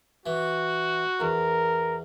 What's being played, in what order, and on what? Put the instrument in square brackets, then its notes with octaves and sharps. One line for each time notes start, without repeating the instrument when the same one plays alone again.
[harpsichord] E3 [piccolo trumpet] F#4
[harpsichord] E2 [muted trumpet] A#4